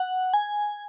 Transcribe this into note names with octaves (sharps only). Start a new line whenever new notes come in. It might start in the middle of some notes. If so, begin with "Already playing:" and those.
Already playing: F#5
G#5